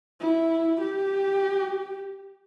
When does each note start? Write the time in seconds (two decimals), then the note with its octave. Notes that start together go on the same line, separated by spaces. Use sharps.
0.20 E4
0.81 G4